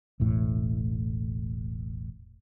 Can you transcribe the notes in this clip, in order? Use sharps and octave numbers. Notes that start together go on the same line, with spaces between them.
E1 A1 A2